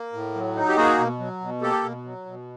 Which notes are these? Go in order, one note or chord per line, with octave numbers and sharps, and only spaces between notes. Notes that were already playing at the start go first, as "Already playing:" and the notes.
Already playing: A#3
A2
F#3
D#4
G4
A#3 F#4 G#4
B2
F#3
B2
A#3 G4 A4
B2
F#3
B2